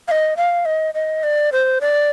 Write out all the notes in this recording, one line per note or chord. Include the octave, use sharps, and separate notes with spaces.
F5
D#5
F5
D#5
D#5
D5
C5
D5